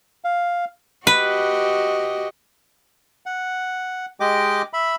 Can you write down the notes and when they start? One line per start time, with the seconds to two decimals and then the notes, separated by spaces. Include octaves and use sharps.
0.24 F5
1.07 F#4 G4 B4 D#5
3.26 F#5
4.20 G#3 G4 D#5 G5 D6
4.73 E5 B5